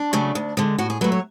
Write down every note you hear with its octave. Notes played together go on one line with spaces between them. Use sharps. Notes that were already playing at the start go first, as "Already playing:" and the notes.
Already playing: D4
C#3 F#3 A3
D2
D3 G#3
A2 F#4
G#4
F#3 A3 B4
C#5